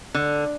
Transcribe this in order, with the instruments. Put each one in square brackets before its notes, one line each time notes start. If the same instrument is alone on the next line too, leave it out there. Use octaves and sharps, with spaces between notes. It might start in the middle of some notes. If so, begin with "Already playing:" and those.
[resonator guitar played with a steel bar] D3